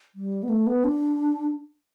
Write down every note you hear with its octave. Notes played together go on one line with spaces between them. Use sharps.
G3
B3
A3
B3
D4